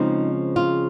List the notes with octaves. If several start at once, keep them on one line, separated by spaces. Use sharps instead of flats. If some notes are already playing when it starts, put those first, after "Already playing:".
Already playing: C#3 F3 G#3 C4 D#4
F4